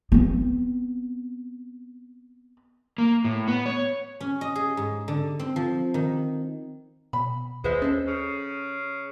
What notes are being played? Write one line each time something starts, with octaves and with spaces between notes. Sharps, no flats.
B3 C4
A#3
A2
B3
C#5
C#4
D#5
G#4
G#2
D3
C4
F3
D#3
B2 B5
D#2 G#3 B4 C5 E5
C#4 A4 C5
C#3